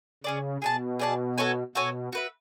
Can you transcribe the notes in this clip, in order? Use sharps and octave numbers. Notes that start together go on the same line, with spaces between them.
C#3 C#4 G#4 D5
B2 G#4 D5 A5
G#4 D5 A5
F#4 A4 C#5 G#5
B2 F#4 A4 C#5 G#5
F#4 B4 E5